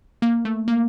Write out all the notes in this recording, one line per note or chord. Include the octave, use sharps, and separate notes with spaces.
A#3
A3
A#3